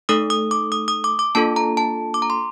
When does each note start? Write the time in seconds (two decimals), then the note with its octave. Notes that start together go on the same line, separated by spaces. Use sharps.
0.09 A3 D#4 A4 D#6
0.30 D#6
0.51 D6
0.72 D#6
0.88 D#6
1.04 D6
1.19 D6
1.35 A#3 D4 F4 A4 A5
1.56 A#5
1.77 A5
2.14 D6
2.22 A#5
2.30 C6